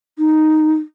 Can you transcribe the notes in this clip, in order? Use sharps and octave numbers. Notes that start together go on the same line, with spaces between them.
D#4